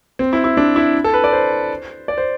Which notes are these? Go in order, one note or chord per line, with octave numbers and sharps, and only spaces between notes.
C4
E4
E4
D4
E4
A4
B4
D5
C5
D5
C5